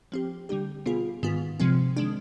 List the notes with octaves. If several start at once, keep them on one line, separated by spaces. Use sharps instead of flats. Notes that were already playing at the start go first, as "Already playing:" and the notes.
F3 C4 G4
D3 G3 D4 G4
B2 B3 F4 G#4
G#2 D#3 B3 F4
C3 F3 G#3 C4
D#3 G#3 D4